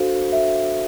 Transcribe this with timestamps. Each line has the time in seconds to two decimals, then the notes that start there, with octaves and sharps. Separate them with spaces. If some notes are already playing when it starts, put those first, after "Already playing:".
Already playing: D4 F#4 A4 C5 F5
0.32 E5